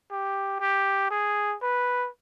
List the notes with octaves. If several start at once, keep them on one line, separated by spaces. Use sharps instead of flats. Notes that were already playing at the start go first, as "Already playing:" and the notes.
G4
G4
G#4
B4